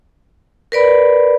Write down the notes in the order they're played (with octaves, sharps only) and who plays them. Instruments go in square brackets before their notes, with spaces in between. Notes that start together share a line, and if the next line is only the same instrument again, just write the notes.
[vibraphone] A#4 B4 D5 B5